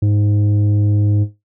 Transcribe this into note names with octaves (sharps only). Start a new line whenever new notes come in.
G#2